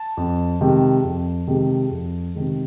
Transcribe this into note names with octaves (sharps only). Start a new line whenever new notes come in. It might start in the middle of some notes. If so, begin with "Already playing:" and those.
Already playing: A5
F2
C3 D#3 G#3
F2
C3 D#3 G#3
F2
C3 D#3 G#3